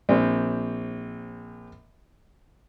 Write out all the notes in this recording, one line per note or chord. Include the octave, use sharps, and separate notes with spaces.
A#1 C4